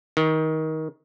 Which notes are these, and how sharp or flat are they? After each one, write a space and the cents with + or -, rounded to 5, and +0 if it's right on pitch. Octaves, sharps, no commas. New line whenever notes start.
D#3 +20